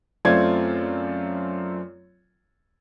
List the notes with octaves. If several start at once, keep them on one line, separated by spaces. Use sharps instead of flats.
F#2 A3 C4 F4 D5 G#6